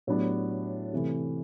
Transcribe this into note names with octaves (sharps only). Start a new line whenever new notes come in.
A2 F#3 B3 D4 G4
C3 E3 A3